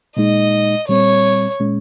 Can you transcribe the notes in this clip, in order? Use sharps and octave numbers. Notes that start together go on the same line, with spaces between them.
A#2 G#3 D#4 D#5
A#2 G3 C4 C#5
A#2 G#3 C#4